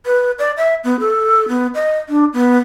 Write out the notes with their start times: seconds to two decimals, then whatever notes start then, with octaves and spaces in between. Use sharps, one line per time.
0.06 B4
0.39 D5
0.57 E5
0.84 B3
1.00 A4
1.49 B3
1.75 D#5
2.09 D4
2.33 B3